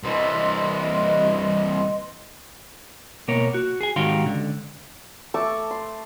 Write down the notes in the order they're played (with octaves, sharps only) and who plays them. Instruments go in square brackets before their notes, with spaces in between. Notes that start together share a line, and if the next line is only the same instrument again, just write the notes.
[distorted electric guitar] C2 E3 [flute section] B4 D#5 C6
[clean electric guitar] B2 A#3 A#4 C#5
F#4
G#4 G#5
G#2 D#3 F#4 G4 F5 C6
C#2 D3
[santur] A3 A5 C#6 D6
C6